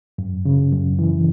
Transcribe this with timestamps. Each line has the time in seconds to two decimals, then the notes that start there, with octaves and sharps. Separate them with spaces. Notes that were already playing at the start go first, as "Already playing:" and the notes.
0.18 F#2
0.45 C#3
0.72 F#2
0.99 E3